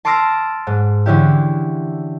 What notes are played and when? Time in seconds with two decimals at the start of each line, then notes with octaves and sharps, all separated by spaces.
0.05 A5 C6 D6 E6 F6 A#6
0.67 G#2
1.06 D3 E3 C#4 D4 E4 G4